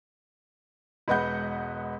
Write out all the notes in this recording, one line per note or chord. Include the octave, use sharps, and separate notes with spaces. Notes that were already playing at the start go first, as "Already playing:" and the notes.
E1 G#3 B4 D#5 F#5 G6